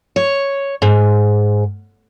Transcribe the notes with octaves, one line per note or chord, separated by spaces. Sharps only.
C#5
G#2